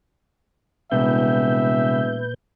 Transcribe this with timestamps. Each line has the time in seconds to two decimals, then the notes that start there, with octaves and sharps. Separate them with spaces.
0.92 E1 C2 A#2 B4 E5 G6